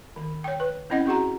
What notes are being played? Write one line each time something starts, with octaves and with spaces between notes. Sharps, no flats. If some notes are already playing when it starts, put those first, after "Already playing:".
D#3
C#5 G5
B4
C4 C#4 E4 D#5 F#5
C4 F#4 G#4 F#5 A#5